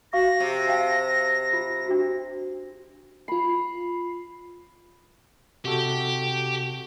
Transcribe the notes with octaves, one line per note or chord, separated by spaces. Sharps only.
F#4 F5 C#6 A#6
C3
F5 G5 A5
F4
D4 F#4
F4 B5 C7
C3 F#4 G4 A4